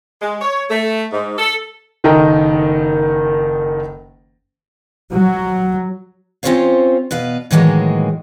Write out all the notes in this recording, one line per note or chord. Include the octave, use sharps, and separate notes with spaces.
G#3
C#5
A3
G#2
A4
F#1 D#3 A4 D#5 G5 A#5
F#3
C4 C#4 F4 C5 C#5 F5
B2 B4 F5
A2 D#3 E3 F#3 G#3 A#3